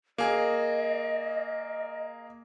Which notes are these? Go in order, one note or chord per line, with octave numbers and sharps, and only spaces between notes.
A#3 G#4 D#5